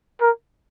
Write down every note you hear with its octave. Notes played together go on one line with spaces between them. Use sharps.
A#4